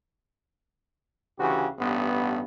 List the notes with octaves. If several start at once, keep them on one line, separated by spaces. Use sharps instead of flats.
D2 C#3 E3 F#4 G4
A1 G2 B3